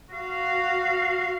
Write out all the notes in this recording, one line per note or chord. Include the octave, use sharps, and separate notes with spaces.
F#4 F5